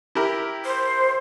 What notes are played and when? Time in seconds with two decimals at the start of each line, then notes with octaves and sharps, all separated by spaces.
0.15 E4 G4 A#4
0.65 C5